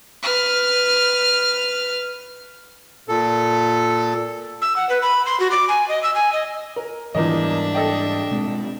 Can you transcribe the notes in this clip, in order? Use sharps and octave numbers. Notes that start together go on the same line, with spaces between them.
B4 F6
A#2 A4
E6
F#5
B4
B5
C6
F#4
D6
G#5
D#5
E6
G#5
D#5
A#4
E2 G#2 E3 G3 D4 A#4 D#5 E5
A4 D#5 G5
B2 G#3 C4